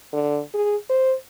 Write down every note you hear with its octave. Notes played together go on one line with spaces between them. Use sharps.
D3
G#4
C5